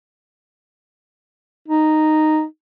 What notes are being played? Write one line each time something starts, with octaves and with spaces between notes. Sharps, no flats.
D#4